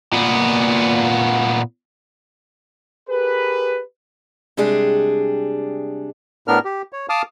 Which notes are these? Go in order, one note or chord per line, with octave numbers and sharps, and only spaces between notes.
A#2 B3
G4 G#4 A#4 B4
C3 G3 G#3 D4 G#4
A2 B3 D4 A#4 F6
G4
C#5
F5 A5 D6 D#6 F6